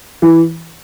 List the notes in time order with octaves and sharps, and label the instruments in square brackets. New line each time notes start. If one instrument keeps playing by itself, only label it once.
[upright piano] E3